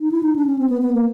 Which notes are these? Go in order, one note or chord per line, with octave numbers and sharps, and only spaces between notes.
D#4
E4
D#4
D4
C#4
C4
B3
B3
A#3